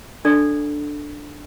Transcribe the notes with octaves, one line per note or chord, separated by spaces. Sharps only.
D4 A4 D5